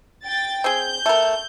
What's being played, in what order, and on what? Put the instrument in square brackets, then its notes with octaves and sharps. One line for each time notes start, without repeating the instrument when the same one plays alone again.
[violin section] G5 A6
[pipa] C4 G#4 [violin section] G6
[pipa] A3 A#4